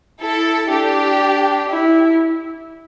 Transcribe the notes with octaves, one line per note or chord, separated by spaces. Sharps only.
E4 A4
D4 G4
E4